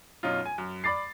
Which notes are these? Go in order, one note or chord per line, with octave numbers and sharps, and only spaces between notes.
F#2 B2 C#4 D#4 F4
G#5
F#2
D5 B5 D6 A6 C7